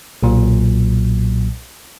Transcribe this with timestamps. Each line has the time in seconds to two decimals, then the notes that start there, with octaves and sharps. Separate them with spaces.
0.23 B1 A#2 F#3